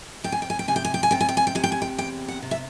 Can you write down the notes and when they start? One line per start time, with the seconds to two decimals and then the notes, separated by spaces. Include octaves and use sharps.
0.24 C3 G5
0.32 G#5
0.42 G5
0.50 G#5
0.59 G5
0.68 C3 G#5
0.76 G5
0.84 G#5
0.94 G5
1.03 G#5
1.11 C3 G5
1.20 G#5
1.29 G5
1.37 G#5
1.47 G5
1.55 C3 G#5
1.64 G5
1.72 G#5
1.82 G5
1.98 E2 G5
2.28 F#5
2.42 C3
2.51 E5